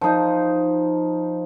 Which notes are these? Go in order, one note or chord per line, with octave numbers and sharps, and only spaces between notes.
F3 D#4